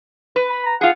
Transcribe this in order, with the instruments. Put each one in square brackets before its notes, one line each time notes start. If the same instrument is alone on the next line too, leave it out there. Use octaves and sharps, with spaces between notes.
[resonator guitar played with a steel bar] B4
[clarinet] B5
A#5
[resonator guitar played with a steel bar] F4 G#4 [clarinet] F#5